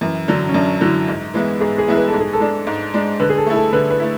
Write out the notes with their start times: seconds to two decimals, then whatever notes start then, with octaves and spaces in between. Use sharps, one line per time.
0.01 F#2 E3
0.28 D3 F#3 D4
0.49 C#4
0.54 F#2 D4
0.81 D3 F#3 E4
1.08 G#2
1.34 E3 G#3 B3 E4
1.60 G#2 G#4
1.78 G#4
1.88 E3 G#3 B3 E4
1.96 B4
2.08 A4
2.13 G#2
2.20 G#4
2.33 A4
2.40 G#3 D4
2.67 G#2
2.94 G#3 D4
3.20 D3 B4
3.30 G#4
3.38 A4
3.46 A3 E4
3.55 A4
3.73 D3 B4
3.90 B4
4.00 A3 E4